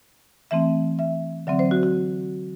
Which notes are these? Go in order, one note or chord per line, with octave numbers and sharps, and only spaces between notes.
E3 A3 C4 E5
E5
D3 F#3 C4 E5
C5
F#4
F#4